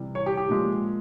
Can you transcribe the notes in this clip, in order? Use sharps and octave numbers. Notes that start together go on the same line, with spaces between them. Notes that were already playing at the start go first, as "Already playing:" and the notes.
Already playing: C3 E3 G3
C#5
G4
G4
A#2 F3 G#3